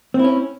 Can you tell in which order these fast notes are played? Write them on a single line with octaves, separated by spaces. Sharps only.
C4 E4 C#4